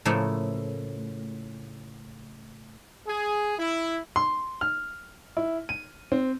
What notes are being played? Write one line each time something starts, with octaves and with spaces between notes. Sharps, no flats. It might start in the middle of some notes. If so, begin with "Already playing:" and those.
A2 C#3 F3 A3 A#3
G#4
E4
C6
F6
E4
D#7
C4